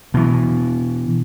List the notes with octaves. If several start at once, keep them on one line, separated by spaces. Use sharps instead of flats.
B2 E3